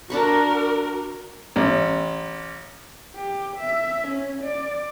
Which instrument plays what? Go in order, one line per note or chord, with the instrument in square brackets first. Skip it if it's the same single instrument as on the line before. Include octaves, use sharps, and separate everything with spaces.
[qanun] D4 B5 C#6 [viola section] F#4 A#4
[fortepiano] A1
[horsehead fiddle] G4
E5
C#4
D5